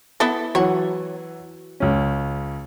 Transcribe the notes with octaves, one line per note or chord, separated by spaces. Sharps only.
B3 E4 A4
E3 F#3 C#5 F#5
C#2 C#4